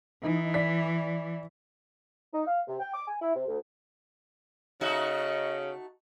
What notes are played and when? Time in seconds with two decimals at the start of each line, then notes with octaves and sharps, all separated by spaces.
0.23 E3 D#4
0.54 D5 B6
2.33 D#4
2.46 F5
2.67 C3
2.79 G5
2.93 D6
3.07 G#5
3.21 E4
3.35 C3
3.47 D2
4.81 C#3 A3 D#4 F#4 D#5